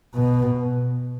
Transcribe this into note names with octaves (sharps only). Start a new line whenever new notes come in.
B2